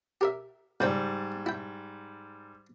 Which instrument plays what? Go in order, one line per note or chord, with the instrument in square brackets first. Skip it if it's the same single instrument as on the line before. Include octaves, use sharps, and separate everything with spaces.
[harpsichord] G4 A#4 E5
[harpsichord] C#2 C5 G5 [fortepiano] G#2 G3
[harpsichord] E4 G5